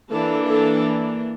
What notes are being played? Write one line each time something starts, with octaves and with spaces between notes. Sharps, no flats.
E3 A#3 D4 A4
A4